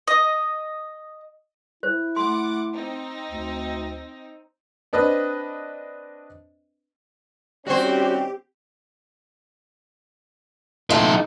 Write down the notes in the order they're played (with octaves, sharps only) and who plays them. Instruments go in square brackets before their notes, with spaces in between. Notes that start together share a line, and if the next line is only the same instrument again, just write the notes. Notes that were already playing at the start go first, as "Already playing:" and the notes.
[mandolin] D#5
[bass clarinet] E4 [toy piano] C5
[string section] A3 F#5 D6 [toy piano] C6
[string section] C4 D#4
[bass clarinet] D2
[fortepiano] C4 D4 B4 D#5
[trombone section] D#3 G3 C#4 [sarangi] C4 [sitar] F#4 C5 [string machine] G4
[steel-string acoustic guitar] A3 A#3 F4 [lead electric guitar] D#4 A4